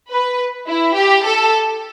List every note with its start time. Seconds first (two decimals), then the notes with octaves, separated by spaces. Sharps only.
0.10 B4
0.67 E4
0.95 G4
1.24 A4